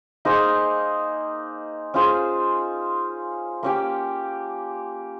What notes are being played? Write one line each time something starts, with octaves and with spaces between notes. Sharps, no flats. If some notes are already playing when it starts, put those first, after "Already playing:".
A#3 D#4 G#4 C5
C#4 F4 G#4 C5
A#3 C#4 G4